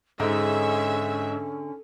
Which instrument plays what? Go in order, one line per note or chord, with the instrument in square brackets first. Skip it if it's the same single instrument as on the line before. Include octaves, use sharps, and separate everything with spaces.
[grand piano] G#2 D#4 [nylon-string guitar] D3 [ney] C#4 [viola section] G#4 E5